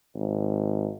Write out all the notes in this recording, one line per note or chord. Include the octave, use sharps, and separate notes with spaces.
G#1